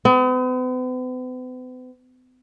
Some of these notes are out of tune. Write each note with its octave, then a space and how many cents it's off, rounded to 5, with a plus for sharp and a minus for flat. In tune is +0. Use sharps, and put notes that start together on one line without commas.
B3 +45